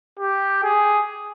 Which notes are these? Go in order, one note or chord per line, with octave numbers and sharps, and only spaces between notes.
G4
G#4